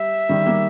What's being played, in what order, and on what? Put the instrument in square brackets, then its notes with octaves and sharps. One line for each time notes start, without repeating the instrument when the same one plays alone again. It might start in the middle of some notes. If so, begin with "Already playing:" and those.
Already playing: [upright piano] G3 [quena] E5
[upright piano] D#3 G3
G3 A#3